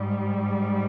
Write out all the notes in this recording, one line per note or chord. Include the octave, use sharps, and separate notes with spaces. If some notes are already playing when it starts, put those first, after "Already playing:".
Already playing: G#2 G3